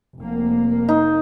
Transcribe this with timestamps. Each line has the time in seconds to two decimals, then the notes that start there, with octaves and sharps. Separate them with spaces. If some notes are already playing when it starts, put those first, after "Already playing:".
0.19 F1 A#3
0.89 D#4